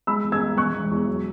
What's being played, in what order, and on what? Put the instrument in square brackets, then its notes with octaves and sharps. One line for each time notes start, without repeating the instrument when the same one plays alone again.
[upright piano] G#3 B5 E6
E2
E6 G#6
G#3
E1 C#6 F#6
E1
E2
F#3